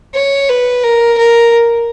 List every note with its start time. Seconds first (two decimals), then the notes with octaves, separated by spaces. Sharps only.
0.15 C#5
0.49 B4
0.84 A#4
1.18 A#4